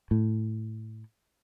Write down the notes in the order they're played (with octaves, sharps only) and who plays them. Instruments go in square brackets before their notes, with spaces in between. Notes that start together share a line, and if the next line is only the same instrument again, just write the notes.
[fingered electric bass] A2